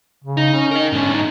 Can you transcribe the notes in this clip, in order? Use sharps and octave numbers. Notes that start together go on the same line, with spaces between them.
C#3
D#4
C#4
A#4 D#5
G#2 D3 C#4
D#4